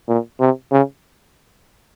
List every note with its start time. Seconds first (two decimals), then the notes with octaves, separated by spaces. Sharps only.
0.08 A#2
0.40 C3
0.72 C#3